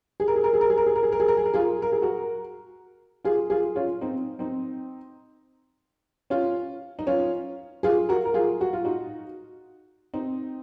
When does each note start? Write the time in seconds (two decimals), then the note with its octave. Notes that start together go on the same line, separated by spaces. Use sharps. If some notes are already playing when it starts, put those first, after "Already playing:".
0.20 G#4
0.28 A#4
0.36 G#4
0.44 A#4
0.54 G#4
0.61 A#4
0.70 G#4
0.78 A#4
0.87 G#4
0.96 A#4
1.03 G#4
1.12 A#4
1.20 G#4
1.28 A#4
1.37 G#4
1.46 A#4
1.54 F4 G#4
1.82 A#4
1.92 G#4
2.02 F#4 A#4
3.25 F4 G#4
3.50 F4 G#4
3.76 C#4 F4
4.01 C4 D#4
4.39 C4 D#4
6.30 C#4 F4
6.99 D#4
7.07 C#4 F4
7.83 F4 G#4
8.09 F#4 A#4
8.25 A#4
8.34 F4 G#4
8.61 F#4
8.73 F4
8.85 D#4 F#4
10.14 C4 D#4